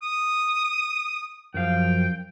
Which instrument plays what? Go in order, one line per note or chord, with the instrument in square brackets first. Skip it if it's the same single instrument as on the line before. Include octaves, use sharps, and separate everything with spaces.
[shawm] D#6
[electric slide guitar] F#2 F3 F5 [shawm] G5